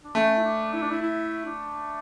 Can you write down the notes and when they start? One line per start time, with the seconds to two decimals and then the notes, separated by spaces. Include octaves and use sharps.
0.04 D4
0.15 A3 C#4
0.37 E4
0.44 D4
0.73 E4
0.82 D4
0.91 E4
1.02 E4
1.46 D4